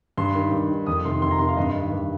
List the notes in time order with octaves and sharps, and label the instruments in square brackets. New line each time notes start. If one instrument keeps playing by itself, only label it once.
[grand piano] G2 C6
D#3
G2
D#3
F2 D#6
C3 D#3 C6
F2 C6
A#5
C3 D#3 C6
F5
G2 D#5
D#3
G2